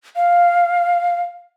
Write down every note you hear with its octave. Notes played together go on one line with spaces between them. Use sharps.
F5